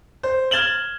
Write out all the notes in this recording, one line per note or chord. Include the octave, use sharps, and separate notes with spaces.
C5
F6 G#6 A6 E7 F#7 G7